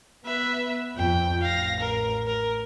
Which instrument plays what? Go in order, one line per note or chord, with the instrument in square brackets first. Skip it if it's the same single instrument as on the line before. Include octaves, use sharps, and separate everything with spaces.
[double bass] B3 [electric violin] B4 E5
[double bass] F2 [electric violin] G5
[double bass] A1 [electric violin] F5 A#6
[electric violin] A#4
A#4